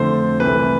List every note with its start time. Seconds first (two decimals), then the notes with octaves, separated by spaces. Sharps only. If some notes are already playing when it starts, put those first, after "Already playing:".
Already playing: F2 D3 A3 C5
0.40 C2 C3 E3 A3 B4